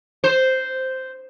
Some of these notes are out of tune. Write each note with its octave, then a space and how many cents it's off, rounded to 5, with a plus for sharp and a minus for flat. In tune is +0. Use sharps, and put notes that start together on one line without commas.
C5 -5